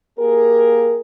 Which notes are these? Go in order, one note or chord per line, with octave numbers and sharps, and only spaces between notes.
A#3 G4 G#4 A#4